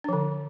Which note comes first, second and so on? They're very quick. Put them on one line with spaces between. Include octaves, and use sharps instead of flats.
D4 F3 D3